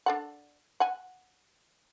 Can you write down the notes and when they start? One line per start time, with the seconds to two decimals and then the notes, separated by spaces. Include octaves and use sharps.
0.06 D4 A4 F#5
0.80 F#5 G#5